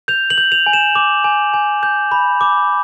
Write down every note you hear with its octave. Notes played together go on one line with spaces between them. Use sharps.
G6 F7
F#7
G6
F7
G#5
E7
D6
G#5
G#5
G6
B5
D6